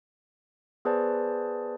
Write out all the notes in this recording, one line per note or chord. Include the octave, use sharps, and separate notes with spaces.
B3 G#4 B4 C5 D5 A5